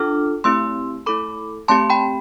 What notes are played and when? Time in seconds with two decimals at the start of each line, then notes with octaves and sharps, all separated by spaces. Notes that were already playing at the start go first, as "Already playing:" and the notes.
Already playing: D4 F4 A4 D6 F6
0.44 A3 C4 E4 G4 C6 E6
1.06 A3 E4 A4 B5 D6
1.68 A3 C4 G4 A5 C6
1.90 G5 B5